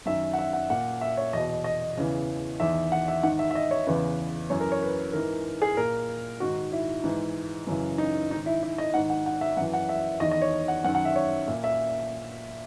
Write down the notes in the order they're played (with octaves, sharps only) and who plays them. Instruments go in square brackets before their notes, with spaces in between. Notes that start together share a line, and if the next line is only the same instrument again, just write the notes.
[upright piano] F#2 D#3 E5
F#5
E5
F#5
A#2 F#5
E5
C#5
E2 B2 D#5
D#5
E2 C#3 E3
E2 D#3 E5
F#5
E5
G#2 D#3 F#5
E5
E5
D#5
C#5
E2 C#3 E3 B4
F#2 E3 C#5
A#4
C#5
B4
G#2 E3 A#4
G#4
A#2 A#4
G#2 D#3 F#4
E4
G#2 E3
F#2 C#3 E3
D#4
G#2 D#4
D#3
E4
E4
D#5
G#2 D#3 F#5
F#5
F#5
E5
F#2 F#5
E3
F#5
E5
E2 D#3 D#5
D#5
C#5
F#5
F#2 F#5
D#3
F#5
E5
C#5
A#2 E5
E5